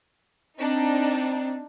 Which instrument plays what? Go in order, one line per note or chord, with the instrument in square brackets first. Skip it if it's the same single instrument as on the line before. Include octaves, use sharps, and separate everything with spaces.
[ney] C4 [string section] D4 D#4